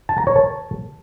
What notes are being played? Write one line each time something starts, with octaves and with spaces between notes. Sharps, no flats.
A5
A#5
C#5
A5